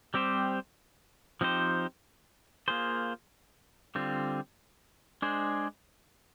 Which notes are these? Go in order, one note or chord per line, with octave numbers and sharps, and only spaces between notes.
G3 C4 G4 C5
F3 C4 D#4 G4 C5
A#3 F4 G#4 C5
D3 G3 C4 F4
G#3 D4 G#4 C5